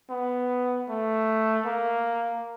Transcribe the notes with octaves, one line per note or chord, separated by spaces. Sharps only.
B3
A3
A#3